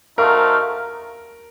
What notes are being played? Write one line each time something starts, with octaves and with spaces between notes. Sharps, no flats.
A3 D#4 F#4 A#4 C5 F5